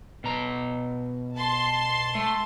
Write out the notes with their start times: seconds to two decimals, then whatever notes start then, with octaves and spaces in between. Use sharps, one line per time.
0.24 B2 A#5
1.36 A5 C6
2.15 A3